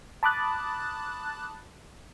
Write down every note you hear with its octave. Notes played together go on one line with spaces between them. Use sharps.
A5 B5 D6 D#6 F#6 A6